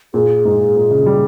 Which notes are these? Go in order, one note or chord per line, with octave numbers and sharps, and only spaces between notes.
A#2 G#4
G#2
A#2
C#3
G3